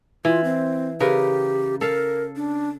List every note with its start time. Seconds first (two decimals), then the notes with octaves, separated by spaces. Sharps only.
0.25 E3 F4
0.44 C4
1.00 C#3 G4 A#4 B4
1.81 A4 A#4 F5
2.36 D4